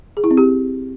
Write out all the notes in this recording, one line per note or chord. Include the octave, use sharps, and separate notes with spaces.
G#4
E4
C4
G4